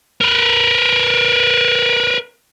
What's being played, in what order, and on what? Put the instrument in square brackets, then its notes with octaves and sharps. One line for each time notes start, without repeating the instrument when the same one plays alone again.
[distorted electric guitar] A#4 B4